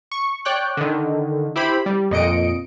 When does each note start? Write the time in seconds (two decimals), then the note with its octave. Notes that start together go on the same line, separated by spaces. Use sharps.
0.12 C#6
0.45 C#5 D5 G5 F#6
0.77 D3 D#3
1.56 E4 G4 C5 B5
1.86 G3
2.11 F2 A#2 D#5 C#7 D7